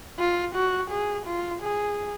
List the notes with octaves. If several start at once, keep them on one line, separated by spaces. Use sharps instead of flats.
F4
F#4
G#4
F4
G#4